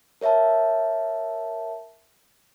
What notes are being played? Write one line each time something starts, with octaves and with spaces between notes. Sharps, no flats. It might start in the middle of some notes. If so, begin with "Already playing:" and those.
A#4 C#5 E5 F5 A5